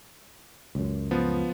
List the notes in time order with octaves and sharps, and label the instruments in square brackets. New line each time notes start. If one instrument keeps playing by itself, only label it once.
[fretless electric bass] C#2 F#2
[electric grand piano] F3 B3